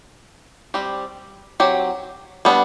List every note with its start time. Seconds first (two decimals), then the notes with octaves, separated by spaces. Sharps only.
0.74 G3 C4 G4
1.60 F#3 C4 G4
2.45 G3 B3 D4